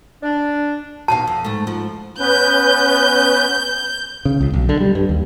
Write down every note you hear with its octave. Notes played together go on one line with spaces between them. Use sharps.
D4
D#2 B2 F5 A5
F2
G#2 A3
G#2 F3
B3 C#4 B4 G6
C#3
C#2
B1
D3
G3
G2
D#2